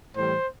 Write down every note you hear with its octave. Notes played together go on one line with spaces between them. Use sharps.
A2 E3 G3 C5